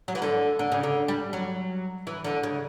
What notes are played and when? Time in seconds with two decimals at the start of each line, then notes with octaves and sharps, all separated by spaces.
0.08 F#3
0.15 E3
0.22 D3
0.59 D3
0.72 C#3
0.83 D3
1.08 G3
1.33 F#3
2.07 E3
2.24 D3
2.43 C#3